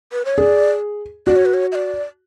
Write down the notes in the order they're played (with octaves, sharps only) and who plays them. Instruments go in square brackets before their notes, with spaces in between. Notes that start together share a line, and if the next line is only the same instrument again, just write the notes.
[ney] B4
C#5
[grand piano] G#4 [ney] D5
[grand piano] F#4 [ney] D5
[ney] C#5
B4
C#5
E5
D5